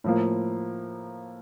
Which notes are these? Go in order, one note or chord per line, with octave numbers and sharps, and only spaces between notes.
A2 F3 A#3